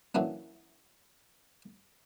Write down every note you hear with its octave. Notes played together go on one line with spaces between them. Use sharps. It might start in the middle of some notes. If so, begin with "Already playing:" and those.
A#2 E3 F#3 C#4 D4